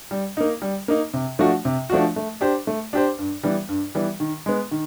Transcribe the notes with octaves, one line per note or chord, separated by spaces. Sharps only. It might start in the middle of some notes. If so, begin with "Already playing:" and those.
G3
A#3 D#4
G3
A#3 D#4
C3
F3 A3 D4 F#4
C3
F3 A3 D4 F#4
A3
D4 G4 C5
A3
D4 G4 C5
G2
E3 G3 B3
G2
E3 G3 B3
D#3
G#3 B3
D#3